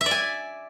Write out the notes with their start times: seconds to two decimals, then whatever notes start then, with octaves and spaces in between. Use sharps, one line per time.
0.01 E5
0.06 D5
0.11 G#5